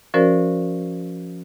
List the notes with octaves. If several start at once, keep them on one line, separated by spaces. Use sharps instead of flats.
F3 C#4 F#4 A#4 C5 D5